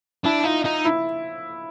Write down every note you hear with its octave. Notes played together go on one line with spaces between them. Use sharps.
D4 E4
D#4 F4
D#4
E4